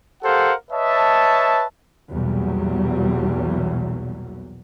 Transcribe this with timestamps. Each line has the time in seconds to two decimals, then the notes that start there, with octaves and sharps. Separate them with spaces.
0.23 G4 A4 A#4 C5 F5 F#5
0.71 B4 C#5 D#5 E5 A5
2.11 B1 E2 A#2 F#3 G3